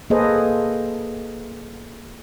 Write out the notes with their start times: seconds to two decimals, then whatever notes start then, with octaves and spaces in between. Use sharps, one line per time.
0.10 A#3 G#4 A4 B4 C5 D#5